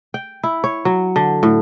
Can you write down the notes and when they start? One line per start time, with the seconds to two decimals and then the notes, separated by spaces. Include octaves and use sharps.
0.14 G5
0.43 E4
0.64 C#5
0.85 F#3
1.16 D3
1.43 A2